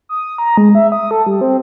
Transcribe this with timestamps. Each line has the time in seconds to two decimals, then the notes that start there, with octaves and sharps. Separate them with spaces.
0.09 D#6
0.38 A#5
0.57 G#3
0.75 E5
0.92 D#6
1.11 A4
1.27 G3
1.41 C4